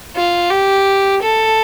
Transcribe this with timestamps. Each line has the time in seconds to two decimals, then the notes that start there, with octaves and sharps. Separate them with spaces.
0.16 F4
0.51 G4
1.22 A4